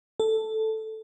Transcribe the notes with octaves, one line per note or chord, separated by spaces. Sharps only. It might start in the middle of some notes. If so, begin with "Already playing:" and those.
A4